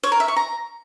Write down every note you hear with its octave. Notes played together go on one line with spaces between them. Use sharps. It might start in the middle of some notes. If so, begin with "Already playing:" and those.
C#5
A#4
E5
C#6
A#5